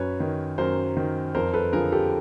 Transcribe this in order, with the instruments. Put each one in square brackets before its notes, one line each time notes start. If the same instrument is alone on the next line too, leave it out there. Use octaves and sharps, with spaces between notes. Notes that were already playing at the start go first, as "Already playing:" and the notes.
Already playing: [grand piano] F#2 B4 C#5
D#3
F#2 A#4 C5
D#3
F2 A#4 C5
A4 B4
D3 F3 G#4 A#4
G4 A4